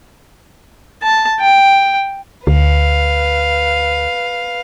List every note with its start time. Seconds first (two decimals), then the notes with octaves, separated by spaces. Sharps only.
1.03 A5
1.41 G5
2.47 D2 B4 F5